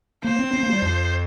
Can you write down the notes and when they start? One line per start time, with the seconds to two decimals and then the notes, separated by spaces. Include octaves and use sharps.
0.24 A#3 C5
0.39 C4
0.53 C4
0.63 A#3
0.72 G3
0.82 F2